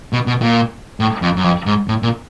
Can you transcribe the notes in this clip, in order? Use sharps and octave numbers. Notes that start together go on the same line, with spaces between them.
B2
B2
A#2
A2
F2
F#2
F2
G#2
A2
A#2